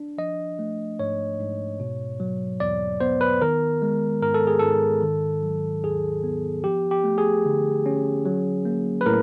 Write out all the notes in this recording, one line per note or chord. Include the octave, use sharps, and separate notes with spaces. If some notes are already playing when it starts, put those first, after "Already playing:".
Already playing: D4
F3 D#5
A3
G#2 C#5
G#2
B2
F#3
E2 D5
B3 C5
B4
D#3 A#4
G#3
G#2 A#4
A4
G#4
G#2 A4
D#3
F#3
D#2 G#4
B3
F3 G4
G4
A3
G#4
D3
C#4
F#3
A#3
B4
A2 A#4